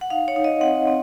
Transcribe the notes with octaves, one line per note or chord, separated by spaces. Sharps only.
F#5
D#4 F5
C#5
D#4
D#5
C4 F#5
C4